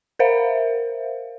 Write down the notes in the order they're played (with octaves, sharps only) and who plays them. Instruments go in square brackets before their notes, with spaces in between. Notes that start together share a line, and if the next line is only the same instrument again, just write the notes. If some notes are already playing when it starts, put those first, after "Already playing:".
[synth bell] A#4 C5 E5 F5